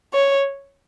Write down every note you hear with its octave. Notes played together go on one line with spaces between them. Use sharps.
C#5